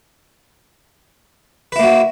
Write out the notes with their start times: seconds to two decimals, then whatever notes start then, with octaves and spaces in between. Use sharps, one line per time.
1.72 B4
1.76 E4
1.79 A#3
1.83 F#4